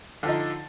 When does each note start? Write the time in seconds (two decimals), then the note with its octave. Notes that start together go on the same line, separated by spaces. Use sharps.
0.23 D3
0.26 F3
0.28 D#4